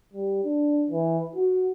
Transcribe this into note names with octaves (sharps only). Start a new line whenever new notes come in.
G3
D4
E3
F#4